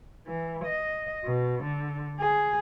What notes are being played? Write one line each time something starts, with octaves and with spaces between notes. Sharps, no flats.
E3
D#5
B2
D3
G#4